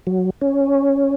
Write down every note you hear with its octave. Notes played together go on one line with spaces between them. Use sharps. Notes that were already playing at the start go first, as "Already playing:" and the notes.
F#3
C#4